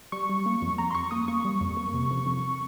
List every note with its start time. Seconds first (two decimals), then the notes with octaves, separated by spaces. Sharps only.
0.12 G3 C#6
0.29 G3
0.46 A#3
0.62 F2
0.78 F2 A#5
0.91 C6
0.95 F2 C#6
1.11 A#3 D#6
1.28 A#3 C#6
1.45 G3
1.61 F2
1.77 A#3
1.94 C3
2.11 F2
2.26 F2